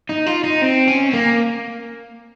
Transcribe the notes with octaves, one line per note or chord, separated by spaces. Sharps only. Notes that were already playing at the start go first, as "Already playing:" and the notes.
D#4
F4
D#4
C4
C#4
C4
A#3